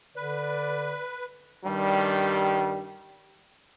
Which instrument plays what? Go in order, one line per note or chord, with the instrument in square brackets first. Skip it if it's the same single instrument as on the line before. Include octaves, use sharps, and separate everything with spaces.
[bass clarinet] D3 [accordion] B4 [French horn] D5
[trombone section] G2 D#3 G3